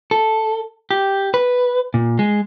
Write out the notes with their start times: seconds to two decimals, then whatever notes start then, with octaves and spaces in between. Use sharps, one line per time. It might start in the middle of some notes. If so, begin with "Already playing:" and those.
0.11 A4
0.91 G4
1.34 B4
1.94 A#2
2.19 G#3